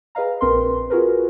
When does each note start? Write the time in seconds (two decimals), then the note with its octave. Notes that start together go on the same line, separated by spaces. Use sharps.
0.15 G#4 B4 D#5 F5 A#5
0.41 A#1 C4 A#4 B4 C6
0.90 F4 F#4 G#4 A#4 B4